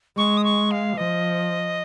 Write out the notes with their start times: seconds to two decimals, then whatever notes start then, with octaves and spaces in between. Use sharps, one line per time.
0.17 G#3 C#6
0.37 D#6
0.44 C#6
0.71 F5
0.98 F3 D#5